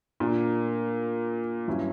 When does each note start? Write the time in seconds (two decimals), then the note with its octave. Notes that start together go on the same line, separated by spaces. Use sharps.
0.20 A#2 A#3 D4
1.68 G2 F#3 C#4 E4